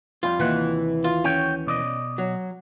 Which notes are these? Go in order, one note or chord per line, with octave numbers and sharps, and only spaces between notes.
F2 G3 F4
D#2 C3 E3 F#5
F4
C#4 F#4 C#5 G5
B2 D5 D#5
F#3